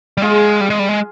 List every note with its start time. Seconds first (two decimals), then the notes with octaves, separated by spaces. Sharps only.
0.17 G3
0.22 G#3 F4 G#4
0.61 G3
0.70 G#3
0.79 G3
0.89 G#3